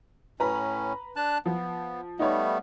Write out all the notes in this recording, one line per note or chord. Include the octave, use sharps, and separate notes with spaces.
A2 C#4 B4 A#5 B5
D4 A5 F#6
F3 B3
G3 A3 B3 D#4 C#5